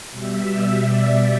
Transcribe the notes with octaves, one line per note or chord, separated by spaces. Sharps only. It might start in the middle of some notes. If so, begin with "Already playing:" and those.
B2 G3 E5
D5